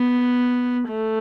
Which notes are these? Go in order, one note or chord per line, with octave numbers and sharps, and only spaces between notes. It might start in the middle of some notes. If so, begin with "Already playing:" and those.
Already playing: B3
A3